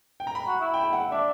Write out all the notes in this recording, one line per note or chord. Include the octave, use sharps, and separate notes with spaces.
G5
A#5
B5
F#4
E4
G5
F#5
D4 E5